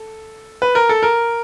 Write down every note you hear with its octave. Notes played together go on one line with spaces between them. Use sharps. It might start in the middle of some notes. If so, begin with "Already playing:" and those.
Already playing: A4
B4
A#4
A4
A#4